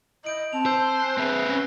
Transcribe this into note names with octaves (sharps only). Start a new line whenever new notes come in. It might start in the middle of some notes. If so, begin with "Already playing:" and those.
E4 D#5 G6 D7 F#7
C4 A5 F7
C5 E6 G6
G#5 F#6 C7
C4 G#4 B4 E5
C#4 A#6 G7